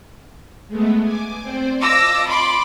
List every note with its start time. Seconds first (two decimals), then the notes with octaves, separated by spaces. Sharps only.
0.68 G#3 A3 B3
1.03 G#5 D6
1.42 C4 C5 D5
1.79 F4 D#5 A5 D6 E6 A#6
2.27 B5 C6 D6